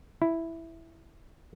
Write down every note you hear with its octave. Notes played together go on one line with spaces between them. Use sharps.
E4